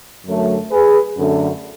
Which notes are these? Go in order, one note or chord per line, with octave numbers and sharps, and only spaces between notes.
F#2 D3 F#3 A3
G#4 B4
F#2 D3 A3